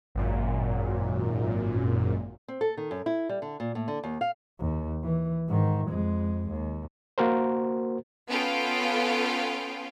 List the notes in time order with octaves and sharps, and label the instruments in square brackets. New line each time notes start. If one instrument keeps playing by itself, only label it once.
[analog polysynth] G#1 F#2 A#2
[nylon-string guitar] C4
A4
D#3
F#2
E4
G3
D3
A#2
A2
D3
D#2
F5
[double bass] D#2
E3
G#2 D#3
F2 G#3
D#2
[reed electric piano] A#3 F#4 A#4 C5
[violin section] B3 C#4 F4 A4 F5 G5